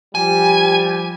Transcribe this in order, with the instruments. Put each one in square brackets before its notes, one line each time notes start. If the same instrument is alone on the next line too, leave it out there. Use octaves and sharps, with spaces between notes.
[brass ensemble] F3 G3 G4 [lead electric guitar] G#5